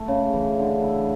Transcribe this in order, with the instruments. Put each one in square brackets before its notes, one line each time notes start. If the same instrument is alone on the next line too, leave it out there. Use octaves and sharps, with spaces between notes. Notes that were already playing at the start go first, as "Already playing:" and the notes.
Already playing: [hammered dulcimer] A3
C#3
E3
D3
E4